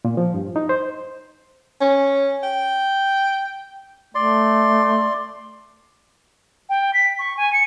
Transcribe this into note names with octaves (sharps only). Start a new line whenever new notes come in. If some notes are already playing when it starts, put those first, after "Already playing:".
A#2
F3
G2
D#4
C5
C#4
G5
A3 D5 C6
G5
B6
C#6
G#5
C#7